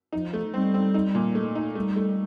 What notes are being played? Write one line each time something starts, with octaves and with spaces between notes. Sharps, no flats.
F3 D#4
A3
G3 C4
C4
D#4
A#2
A3
D#4
G3 A3
A3